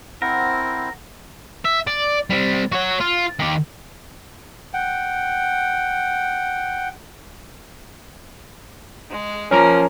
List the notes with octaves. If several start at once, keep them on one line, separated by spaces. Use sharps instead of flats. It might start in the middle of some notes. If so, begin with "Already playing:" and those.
C4 E4 A#4 C5 F#5
E5
D5
G3 C4
F#4 C#5
F4
D#3 G4
F#5 G5
G#3
F3 A#3 C#4 A#4 A#5